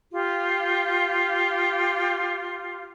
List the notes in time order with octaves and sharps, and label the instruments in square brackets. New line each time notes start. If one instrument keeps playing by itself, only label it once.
[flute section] F4 G4